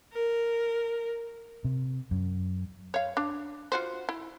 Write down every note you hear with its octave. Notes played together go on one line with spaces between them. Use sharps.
A#4
C3
F#2
C#5 F5
D4
F4 F#4 C5
E4